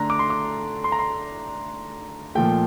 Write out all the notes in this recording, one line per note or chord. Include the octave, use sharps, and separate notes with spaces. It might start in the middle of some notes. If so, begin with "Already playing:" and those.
Already playing: D3 A3 D4 A#5 C6
D6
C6
D6
C6
A#5
C6
A#2 F3 A3 G5